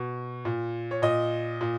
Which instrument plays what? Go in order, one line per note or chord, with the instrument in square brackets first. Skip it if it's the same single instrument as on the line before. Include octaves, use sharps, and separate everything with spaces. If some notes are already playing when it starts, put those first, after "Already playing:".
Already playing: [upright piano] B2
A#2
C#5
A#2 D#5
A#2